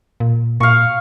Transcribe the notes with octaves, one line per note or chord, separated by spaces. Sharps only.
A#2
A#2 F5 C#6